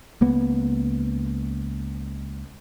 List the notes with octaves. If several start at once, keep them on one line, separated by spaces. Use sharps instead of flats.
C#2 A#3 B3